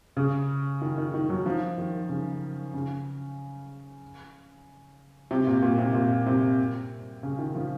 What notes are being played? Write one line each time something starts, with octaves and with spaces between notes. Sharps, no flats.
C#3
D#3
D#3
D#3
F#3
F3
D#3
C#3
C#3
C3
A#2
A#2
C3
A#2
C3
C#3
D#3
F3